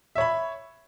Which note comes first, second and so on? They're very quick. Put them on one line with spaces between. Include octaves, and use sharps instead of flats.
E5 C#5 B5